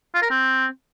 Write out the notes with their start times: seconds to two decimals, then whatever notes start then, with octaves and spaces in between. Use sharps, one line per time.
0.15 F4
0.23 A#4
0.31 C4